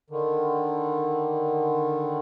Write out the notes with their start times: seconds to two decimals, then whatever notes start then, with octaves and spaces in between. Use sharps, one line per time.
0.10 D3 D#3